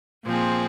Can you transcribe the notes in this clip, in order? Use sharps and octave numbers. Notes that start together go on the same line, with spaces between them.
A#2 F3 C4 G#4